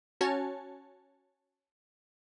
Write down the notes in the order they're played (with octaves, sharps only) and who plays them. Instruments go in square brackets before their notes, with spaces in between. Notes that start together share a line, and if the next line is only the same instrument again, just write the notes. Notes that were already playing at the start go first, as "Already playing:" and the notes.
[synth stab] C#4 F#4 C#5 G#5 A5